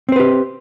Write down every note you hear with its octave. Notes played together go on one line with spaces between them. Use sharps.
C4 G4 B4 C5